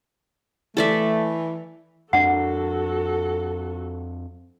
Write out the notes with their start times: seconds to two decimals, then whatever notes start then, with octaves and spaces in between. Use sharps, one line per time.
0.77 E3 A3 A4 D5 E5
2.13 F2 D4 F#4 A4 F#5